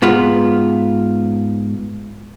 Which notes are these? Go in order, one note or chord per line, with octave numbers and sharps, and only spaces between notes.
G#2 B3 F4